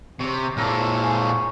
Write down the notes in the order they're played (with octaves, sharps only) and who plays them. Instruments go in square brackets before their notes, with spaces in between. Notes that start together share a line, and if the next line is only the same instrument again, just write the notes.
[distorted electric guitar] C3 [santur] C#5 D5
[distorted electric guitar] A#2 A4 [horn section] G#3 C5 C#5 [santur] A#4 E5 A#5
[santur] G#5 C#6